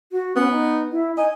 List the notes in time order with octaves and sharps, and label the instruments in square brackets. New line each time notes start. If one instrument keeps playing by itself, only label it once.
[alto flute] F#4
[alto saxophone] B3 [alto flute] C#4
[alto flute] D#4
E4
[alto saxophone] D#5 [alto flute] G#5